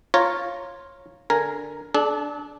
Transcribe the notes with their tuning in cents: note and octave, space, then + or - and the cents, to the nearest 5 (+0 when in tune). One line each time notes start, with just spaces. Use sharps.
F4 +0 C#5 -15 A#5 +0
D3 +0 A#4 +0 G#5 +0
D4 +0 A4 -40